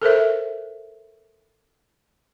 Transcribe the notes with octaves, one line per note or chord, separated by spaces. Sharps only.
A4 A#4 C5 E5